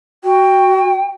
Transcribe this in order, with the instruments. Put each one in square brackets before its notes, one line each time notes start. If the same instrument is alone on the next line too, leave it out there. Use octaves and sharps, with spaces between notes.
[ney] F#4 [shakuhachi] G5